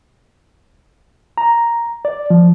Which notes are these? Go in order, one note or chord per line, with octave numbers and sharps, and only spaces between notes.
A#5
D5
F3